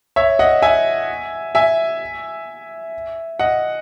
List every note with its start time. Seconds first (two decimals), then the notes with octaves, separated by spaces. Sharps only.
0.16 C#5 E5
0.39 D#5 F#5
0.62 E5 G#5
1.55 E5 G#5
3.39 D#5 F#5